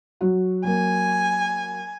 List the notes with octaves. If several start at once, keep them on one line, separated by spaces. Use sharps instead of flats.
F#3 F#4
F#3 A#3 G#5